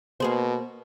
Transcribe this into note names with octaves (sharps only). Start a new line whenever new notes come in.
B2 A#3 G#4 C5